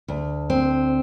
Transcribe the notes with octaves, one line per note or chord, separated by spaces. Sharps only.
D2
C4